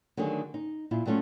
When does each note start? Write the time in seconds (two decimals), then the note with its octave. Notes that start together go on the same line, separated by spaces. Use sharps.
0.17 D3 D#3 F#3 A3 G#4
0.54 D#4
0.91 A#2 E4 F4
1.06 F#3 G3 A3 C#4 F4